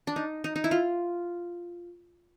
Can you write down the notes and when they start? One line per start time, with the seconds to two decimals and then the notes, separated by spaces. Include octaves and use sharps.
0.07 D4
0.16 D#4
0.44 D#4
0.56 D#4
0.64 E4
0.71 F4